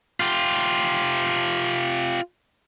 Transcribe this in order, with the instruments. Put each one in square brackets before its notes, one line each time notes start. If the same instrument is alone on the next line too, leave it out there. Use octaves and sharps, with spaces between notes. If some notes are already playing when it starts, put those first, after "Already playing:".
[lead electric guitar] F4 G4